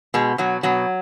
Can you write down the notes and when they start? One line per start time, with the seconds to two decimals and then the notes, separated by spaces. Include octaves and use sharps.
0.14 B2 G#3
0.38 B2 F#3
0.63 B2 F#3